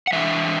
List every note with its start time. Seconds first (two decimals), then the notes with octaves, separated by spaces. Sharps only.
0.07 F#5
0.13 E3 G#3 D4 E5